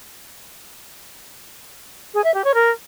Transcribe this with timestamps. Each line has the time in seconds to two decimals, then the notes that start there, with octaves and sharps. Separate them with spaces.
2.14 G#4
2.24 E5
2.34 G4
2.44 C#5
2.54 A#4